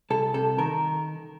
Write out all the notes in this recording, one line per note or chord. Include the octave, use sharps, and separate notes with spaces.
C2 A4
C3 A4
D#3 A#4